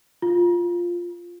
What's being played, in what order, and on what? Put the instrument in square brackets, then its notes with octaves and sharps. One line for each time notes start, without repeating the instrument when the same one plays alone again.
[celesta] F4